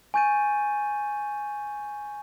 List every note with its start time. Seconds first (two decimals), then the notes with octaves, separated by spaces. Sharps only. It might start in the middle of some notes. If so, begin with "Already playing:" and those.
0.14 G#5 C#6 G6 A6 D#7